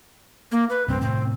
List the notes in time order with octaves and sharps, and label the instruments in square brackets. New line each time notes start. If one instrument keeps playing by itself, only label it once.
[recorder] A#3
B4
[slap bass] C2 G2 B2 [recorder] C4
[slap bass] A2 C3 D#3 [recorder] C4